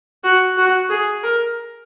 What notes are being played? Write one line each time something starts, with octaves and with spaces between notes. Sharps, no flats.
F#4
F#4
G#4
A#4